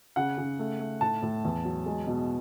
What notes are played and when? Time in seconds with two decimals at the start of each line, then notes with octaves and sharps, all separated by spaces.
0.16 C#3 F#5
0.38 C#3
0.59 A3
0.80 A3
1.01 A2 A5
1.23 A2
1.44 E2
1.65 F#3
1.86 G#3
2.07 B2